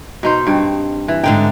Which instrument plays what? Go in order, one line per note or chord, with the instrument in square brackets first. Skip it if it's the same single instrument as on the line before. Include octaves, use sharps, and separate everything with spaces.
[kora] B2 D#4 C5
G2 C4
E3
[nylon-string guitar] G#2 D3 G5 [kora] D#4